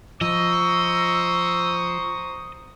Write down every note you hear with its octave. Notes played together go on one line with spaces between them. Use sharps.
F3 C5 D#5 A#5 C#6 E6